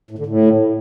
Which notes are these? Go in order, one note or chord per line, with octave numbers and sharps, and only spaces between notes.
A2
D3
A2